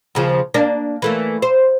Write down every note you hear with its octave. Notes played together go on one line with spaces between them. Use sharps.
D#2 C#3 F3
A#3 D4
E3 A3 A#3
C5